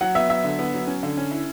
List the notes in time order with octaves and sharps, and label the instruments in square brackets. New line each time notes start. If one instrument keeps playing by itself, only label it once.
[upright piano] F#3 F#5
B3 E5
F#3 E5
D3
B3
F#3
C#4
D3
C#4
E4